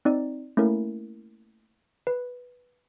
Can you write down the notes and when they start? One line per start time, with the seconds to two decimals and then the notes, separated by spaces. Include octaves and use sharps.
0.05 C4 D#4 D5
0.57 A3 A#3 C#4 E4 A#4
2.07 B4